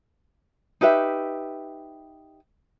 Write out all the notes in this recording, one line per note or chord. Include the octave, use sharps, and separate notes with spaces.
D#4 G4 B4 E5